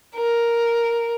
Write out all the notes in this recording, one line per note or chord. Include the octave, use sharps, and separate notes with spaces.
A#4